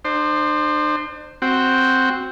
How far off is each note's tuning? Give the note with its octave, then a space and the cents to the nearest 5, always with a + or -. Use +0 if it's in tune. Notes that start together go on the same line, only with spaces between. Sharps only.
D4 +40 C5 +0
C4 +0 F#4 +0 G5 +0